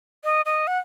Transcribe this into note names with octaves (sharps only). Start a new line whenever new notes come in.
D#5
D#5
F#5